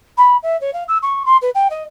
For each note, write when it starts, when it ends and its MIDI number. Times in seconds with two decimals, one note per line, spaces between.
0.17 0.36 83
0.42 0.59 76
0.61 0.73 73
0.73 0.83 77
0.88 0.97 88
1.02 1.23 85
1.25 1.37 84
1.41 1.50 71
1.54 1.67 79
1.70 1.83 75